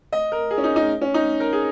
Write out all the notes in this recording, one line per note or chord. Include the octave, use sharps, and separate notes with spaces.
D#5
A#4
G#4
C#4
D#4
D#4
C#4
D#4
A#4
G#4